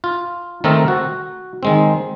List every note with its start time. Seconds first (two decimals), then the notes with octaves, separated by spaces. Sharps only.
0.04 F4
0.64 D#3 A3 C4 D#4 A4 A#4
0.88 F#4
1.63 D#3 G#3 C4